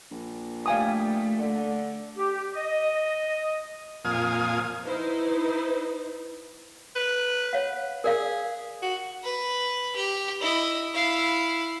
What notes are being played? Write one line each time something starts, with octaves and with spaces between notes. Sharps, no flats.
A#1
G3 A3 F5 G#5 D#6
D3
G4
D#5
F2 A#2 F5 G#5 D#6
D#4 E4 B4 C5
B4
C#5 F5 F#5
G#4 A#4 D5 F5
F#4
B4
G4
E4 D#5
E4 F5